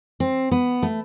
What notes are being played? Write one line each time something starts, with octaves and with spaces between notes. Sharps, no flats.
C4
B3
A3